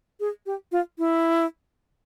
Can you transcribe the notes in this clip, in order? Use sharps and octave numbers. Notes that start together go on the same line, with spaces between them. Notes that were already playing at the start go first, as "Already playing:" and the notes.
G#4
G4
F4
E4